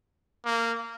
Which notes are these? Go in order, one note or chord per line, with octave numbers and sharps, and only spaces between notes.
A#3